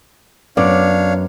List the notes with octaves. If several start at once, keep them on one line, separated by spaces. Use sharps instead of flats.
F#2 B3 D4 C#5 D5 F5